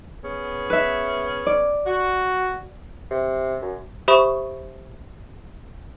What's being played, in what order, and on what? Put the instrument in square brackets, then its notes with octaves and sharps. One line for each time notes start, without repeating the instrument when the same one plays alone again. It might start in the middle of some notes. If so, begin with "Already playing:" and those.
[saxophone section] B3 C#4 G#4
[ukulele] B4 E5
D5
[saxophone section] F#4
[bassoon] C3
F#2
[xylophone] G4 C5 E5 B5 C#6 D#6